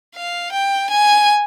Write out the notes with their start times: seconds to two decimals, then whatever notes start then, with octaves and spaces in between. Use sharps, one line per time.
0.15 F5
0.52 G5
0.90 G#5